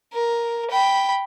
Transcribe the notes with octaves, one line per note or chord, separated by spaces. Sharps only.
A#4
G5 B5